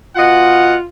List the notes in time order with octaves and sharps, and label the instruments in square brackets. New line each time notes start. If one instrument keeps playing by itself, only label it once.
[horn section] B2 D#5 F#5 [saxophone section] F4